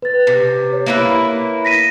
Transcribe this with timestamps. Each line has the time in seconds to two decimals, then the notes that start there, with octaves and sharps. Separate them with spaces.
0.02 B4 A6
0.27 C3
0.73 C#5
0.86 A#3 E4 B4
1.65 A#6 B6 D#7